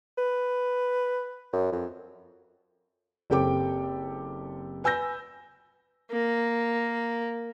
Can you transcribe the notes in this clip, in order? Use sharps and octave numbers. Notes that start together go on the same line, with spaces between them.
B4
F#2
F2
F#1 C4 G4 A4 G5 D6
B4 G#5 E6 G6 A#6
A#3